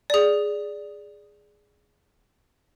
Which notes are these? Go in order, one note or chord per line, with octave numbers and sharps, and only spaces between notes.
G#4 D5